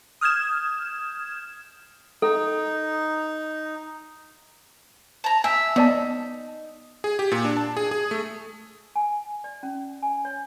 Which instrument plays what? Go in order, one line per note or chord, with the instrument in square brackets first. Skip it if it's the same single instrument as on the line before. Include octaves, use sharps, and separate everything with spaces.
[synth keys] D#6 F6 G6 G#6 E7
[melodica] D#4 [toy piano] A4
[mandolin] A5 A#5
[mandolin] E5 [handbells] G#5
[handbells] B3 D5 A5 [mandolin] D#4
[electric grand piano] G#4
G4
A#2
D4
A5
G#4
G#4
A3
[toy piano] G#5
D5
C#4
G#5
C#5